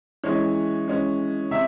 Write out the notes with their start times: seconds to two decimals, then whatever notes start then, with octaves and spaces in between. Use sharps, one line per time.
0.24 E3 G#3 C#4 C#5
0.88 E3 G#3 C#4
1.51 C3 E5